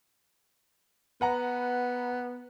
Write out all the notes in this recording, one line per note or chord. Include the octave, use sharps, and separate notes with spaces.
B3 B4 F#5 A#5